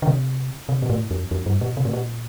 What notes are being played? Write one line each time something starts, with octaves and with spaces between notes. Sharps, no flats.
D3
C3
C3
A#2
A2
F2
F2
G2
A#2
C3
A2
A#2